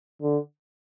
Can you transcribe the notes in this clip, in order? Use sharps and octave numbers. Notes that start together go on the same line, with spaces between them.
D3